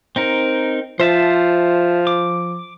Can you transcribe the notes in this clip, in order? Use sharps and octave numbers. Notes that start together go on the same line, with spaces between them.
C4 D#4 A#4
F3 C5 E5 A5
D6